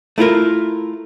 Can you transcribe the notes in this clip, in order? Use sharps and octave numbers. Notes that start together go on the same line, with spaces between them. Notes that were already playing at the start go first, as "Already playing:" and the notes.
A3 E4 F4 A#4